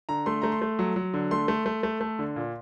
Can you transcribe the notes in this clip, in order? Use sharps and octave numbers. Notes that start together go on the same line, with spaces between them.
D3 A#5
A3 C6
A3 A#5
C6
A3
F#3
F#3
D3
A3 C6
A3
A3
A3
A3
D3
A#2